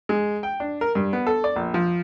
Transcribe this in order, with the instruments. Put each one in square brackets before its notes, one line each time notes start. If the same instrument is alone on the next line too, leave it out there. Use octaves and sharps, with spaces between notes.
[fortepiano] G#3
G5
D4
A#4
G2
B3
A4
D5
A#1
F3